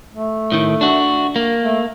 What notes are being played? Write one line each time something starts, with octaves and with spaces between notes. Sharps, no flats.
A3
A2 D#3
D4 F#4
A#3
A3